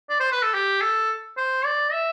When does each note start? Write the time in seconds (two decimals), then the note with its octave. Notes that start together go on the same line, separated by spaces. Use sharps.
0.09 D5
0.20 C5
0.32 B4
0.42 A4
0.54 G4
0.81 A4
1.37 C5
1.65 D5
1.92 E5